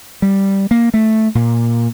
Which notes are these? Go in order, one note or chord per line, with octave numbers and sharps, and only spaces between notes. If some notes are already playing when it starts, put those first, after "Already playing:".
G3
A#3
A3
A#2